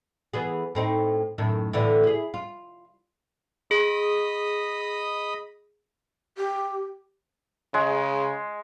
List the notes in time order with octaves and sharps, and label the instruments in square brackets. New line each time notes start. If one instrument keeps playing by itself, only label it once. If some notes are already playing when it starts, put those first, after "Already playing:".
[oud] E3 B3 G#4
A2 C4 D#4
F#2 A2 D#3
A2 D3 E3
E4 G#4
F4
[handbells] G#4 [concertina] D#5 B5 D#6
[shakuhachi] G4
[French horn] C#3 [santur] G#3